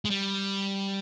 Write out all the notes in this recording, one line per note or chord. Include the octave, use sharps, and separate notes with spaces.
G#3
G3